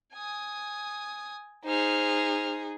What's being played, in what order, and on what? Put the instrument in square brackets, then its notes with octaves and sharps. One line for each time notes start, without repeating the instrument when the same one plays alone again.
[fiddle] G#5 D#6
[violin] D#4 G#4 [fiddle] C5 F6